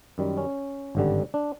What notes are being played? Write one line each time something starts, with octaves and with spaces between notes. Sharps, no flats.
F#2 D#3 G3
C#4
G#1 G2 D3 G3
D4